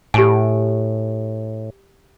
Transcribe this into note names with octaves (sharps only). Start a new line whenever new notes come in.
A2 G4 G#5